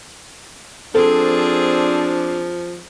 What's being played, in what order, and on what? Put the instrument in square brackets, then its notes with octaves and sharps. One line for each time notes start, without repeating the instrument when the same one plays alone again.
[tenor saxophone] F3 [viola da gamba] C4 G#4 [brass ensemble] D4 [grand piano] A4